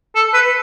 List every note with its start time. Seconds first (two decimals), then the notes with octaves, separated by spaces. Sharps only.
0.15 A4
0.33 B4